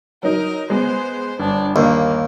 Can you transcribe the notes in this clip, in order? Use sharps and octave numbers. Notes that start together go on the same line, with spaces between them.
F#3 D#4 A#4
G#3 B3 C5
G1 D4
D#2 A#3